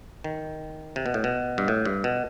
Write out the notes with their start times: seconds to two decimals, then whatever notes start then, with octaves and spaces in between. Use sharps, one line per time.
0.24 D#3
0.96 C3
1.06 B2
1.14 A2
1.24 B2
1.58 G2
1.68 A2
1.85 G2
2.04 B2